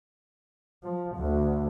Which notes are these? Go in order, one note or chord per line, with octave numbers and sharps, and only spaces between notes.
F3
D2